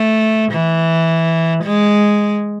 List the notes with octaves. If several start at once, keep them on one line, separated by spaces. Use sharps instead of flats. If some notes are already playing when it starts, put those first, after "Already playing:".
Already playing: A3
E3
G#3